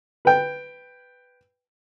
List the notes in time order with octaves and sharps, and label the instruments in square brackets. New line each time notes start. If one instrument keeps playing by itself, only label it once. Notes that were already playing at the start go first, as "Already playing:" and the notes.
[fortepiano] B4 G5